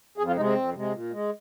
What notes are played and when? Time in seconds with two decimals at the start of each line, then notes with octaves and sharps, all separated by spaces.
0.18 F2 G#4
0.27 F4
0.36 C3 G#3 D#4
0.45 C4
0.55 F2
0.74 C3 G#3
0.93 A#2
1.12 G#3